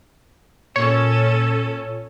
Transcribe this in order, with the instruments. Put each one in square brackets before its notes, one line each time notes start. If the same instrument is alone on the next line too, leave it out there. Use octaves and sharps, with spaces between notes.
[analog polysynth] A#2 [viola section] C#4 A4 [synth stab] C#5